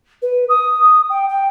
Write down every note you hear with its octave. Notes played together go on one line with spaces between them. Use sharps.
B4
D#6
G5
G5